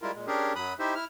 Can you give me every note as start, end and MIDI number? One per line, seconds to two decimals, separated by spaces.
0.02 0.11 55
0.02 0.11 56
0.02 0.11 64
0.02 0.11 65
0.02 0.11 70
0.14 0.26 46
0.14 0.26 56
0.27 0.53 61
0.27 0.53 62
0.27 0.53 67
0.27 0.53 68
0.27 0.53 70
0.56 0.74 42
0.56 0.74 54
0.56 0.74 83
0.56 0.74 87
0.56 0.74 90
0.79 0.94 63
0.79 0.94 64
0.79 0.94 67
0.79 0.94 72
0.79 0.94 76
0.95 1.05 64
0.95 1.05 89